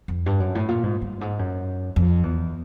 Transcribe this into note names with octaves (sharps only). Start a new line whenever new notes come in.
F2
G2
F#2
A2
A#2
G#2
G2
G#2
F#2
F2
E2